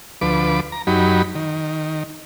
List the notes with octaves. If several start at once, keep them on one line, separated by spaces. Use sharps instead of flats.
D2 F3 B4 D6
A#5
F#2 F#3 D#4 G4 B5
D#3